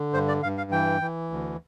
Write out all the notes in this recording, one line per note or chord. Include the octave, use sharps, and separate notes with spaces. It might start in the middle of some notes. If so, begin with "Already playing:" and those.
Already playing: D3
G2 C5
D5
G2 F5
F5
E3 G5
E3
D2